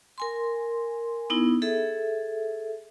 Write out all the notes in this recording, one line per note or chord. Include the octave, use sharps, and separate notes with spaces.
A#4 G#5 C6
B3 D#4 E4
G#4 A4 E5